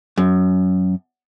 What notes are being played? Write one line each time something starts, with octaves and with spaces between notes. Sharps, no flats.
F#2